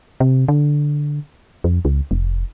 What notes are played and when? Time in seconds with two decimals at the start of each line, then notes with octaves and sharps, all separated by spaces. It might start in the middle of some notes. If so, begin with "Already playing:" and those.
0.20 C3
0.48 D3
1.64 F2
1.85 C#2
2.11 F1